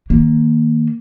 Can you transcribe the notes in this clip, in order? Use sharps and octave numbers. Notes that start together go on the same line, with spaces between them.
D#3 A#3